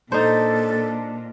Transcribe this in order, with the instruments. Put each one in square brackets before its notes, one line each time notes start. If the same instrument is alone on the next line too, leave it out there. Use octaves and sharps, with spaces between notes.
[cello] A#2 [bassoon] D4 [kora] D#4 C5 [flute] A4